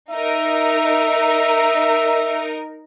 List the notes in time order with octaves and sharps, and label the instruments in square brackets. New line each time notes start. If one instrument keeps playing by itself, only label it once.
[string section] D#4 A#4 [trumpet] E5